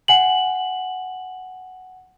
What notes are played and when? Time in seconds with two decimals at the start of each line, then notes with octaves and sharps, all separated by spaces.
0.08 F#5 G#5 F#7